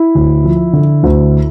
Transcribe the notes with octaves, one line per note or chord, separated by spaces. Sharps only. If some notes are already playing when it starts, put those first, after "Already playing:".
Already playing: E4
D2
F3
D3
D2